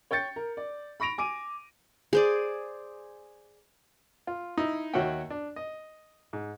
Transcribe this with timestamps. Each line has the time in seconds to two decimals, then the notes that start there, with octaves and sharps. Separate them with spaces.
0.11 C#5 G5 G6 A6 C#7
0.36 A#4
0.57 D5
1.00 B5 C#6 A#6 D7 F7
1.18 G#5 D6 D7 D#7
2.13 G#4 C5 D5
4.27 F4
4.58 D#4 E4
4.94 D#2 F#4 C#5 E5 F#5 G5
5.30 D4
5.56 D#5
6.33 G#2